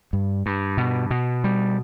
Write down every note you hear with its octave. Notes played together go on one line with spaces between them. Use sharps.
G2
G2
B2
B2
G3